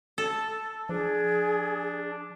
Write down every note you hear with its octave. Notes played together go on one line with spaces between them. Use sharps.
A4
F3 D4 G#4